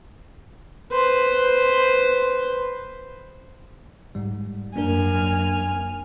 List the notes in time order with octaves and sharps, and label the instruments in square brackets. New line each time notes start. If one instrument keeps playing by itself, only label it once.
[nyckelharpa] B4 C5
[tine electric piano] G#2 G3
[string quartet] F#2 G#5 F6 [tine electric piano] A#3 D4 A#4